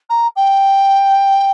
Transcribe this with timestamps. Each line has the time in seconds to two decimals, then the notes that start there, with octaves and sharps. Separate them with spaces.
0.09 A#5
0.36 G5